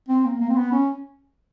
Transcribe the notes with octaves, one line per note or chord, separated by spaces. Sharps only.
C4
A#3
A#3
C4
B3
C#4